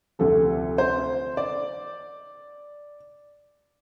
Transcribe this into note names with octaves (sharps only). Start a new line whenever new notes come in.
D2 C3 F3 A4
C5
D5